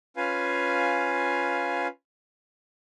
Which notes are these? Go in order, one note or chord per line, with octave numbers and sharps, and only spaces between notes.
C#4 F4 B4 F5 G#5